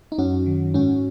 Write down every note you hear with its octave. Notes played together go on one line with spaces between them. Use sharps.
D#4
F#2 C#4 F#4
D#3
G#2 C#4 F#4